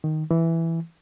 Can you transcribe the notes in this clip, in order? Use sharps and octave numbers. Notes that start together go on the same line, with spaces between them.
D#3
E3